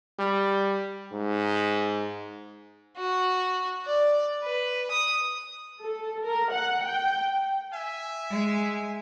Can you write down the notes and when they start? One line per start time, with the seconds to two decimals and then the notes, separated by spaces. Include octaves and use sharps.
0.19 G3
1.12 G#2
2.97 F#4
3.86 D5
4.43 B4
4.91 D#6
5.82 A4
6.24 A#4
6.53 F#5
6.85 G5
7.71 E5 G#5
8.30 G#3